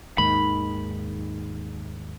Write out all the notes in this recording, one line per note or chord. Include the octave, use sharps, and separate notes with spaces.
D#2 G#2 D#3 B5